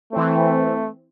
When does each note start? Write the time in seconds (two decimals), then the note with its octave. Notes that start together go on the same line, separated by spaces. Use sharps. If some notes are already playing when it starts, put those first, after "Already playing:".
0.13 E3 A3 C4